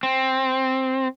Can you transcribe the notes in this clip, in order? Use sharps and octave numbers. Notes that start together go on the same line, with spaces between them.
C4